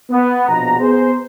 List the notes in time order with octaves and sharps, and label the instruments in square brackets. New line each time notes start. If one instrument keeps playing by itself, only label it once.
[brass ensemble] B3
A#1 B2 A#5
B3 G#4 C5